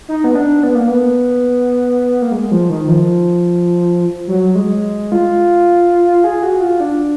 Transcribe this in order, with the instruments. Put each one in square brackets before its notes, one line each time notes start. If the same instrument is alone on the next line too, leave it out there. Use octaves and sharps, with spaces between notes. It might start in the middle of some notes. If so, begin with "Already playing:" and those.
[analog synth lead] D#4
B3
D4
B3
A#3
B3
A#3
G#3
F3
D#3
F3
F#3
G#3
F4
G#4
F#4
F4
D4